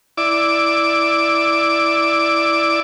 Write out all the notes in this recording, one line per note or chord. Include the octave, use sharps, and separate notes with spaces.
E4 D5 D6